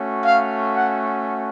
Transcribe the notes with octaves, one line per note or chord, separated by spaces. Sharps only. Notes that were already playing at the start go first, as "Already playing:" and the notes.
Already playing: A3 C#4 F#4
F5
F#5